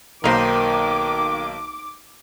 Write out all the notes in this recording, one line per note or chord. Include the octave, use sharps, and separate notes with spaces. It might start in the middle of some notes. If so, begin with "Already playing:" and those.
B1 D#3 A#3 D#4 A#4 C5 D6